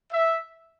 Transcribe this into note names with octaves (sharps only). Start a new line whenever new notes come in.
E5